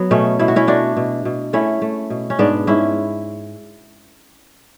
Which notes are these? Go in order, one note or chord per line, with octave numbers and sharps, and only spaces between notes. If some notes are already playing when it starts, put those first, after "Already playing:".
Already playing: F#3 B3
B2 A3 C#4
B2 E4
F#4
C#4 E4
A3 D4 F#4
B2
B2
A3 C#4 E4
A3
B2
C#4
G#2 B3 D4
G#2 C#4 E4